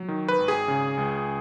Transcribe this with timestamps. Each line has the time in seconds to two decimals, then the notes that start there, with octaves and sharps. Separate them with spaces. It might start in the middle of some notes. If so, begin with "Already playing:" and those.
Already playing: F#3
0.08 D#3
0.28 B4
0.38 G#1
0.48 G#4
0.68 C#3
0.98 C#2